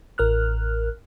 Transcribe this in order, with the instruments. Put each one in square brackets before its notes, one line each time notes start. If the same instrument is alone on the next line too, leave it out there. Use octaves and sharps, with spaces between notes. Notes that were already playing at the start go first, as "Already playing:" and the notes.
[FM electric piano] A1 A#4 F6 F#6